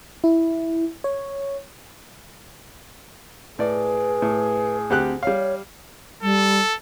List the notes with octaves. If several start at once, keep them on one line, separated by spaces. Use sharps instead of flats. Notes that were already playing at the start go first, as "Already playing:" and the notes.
E4
C#5
A2 G#4 B4 D5
A2
D2 C4 G4 F#6
G3 C#5 F5
G3 A4